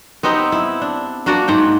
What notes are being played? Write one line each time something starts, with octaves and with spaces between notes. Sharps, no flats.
B3 C4 D#4 G4
E4
D4
A#3 D4 F#4 D5
G#2 F#5 G5